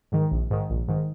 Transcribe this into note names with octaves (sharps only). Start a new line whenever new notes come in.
G#2 D#3
A#1
G#2 D#3
A#1
G#2 D#3